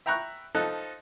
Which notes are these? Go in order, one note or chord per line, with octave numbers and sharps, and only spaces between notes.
E5 G5 A#5 B5 C#6 F#6
F3 D#4 A4 F#6